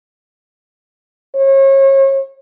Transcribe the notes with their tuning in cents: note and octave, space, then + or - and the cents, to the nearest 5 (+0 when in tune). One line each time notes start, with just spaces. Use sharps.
C#5 -35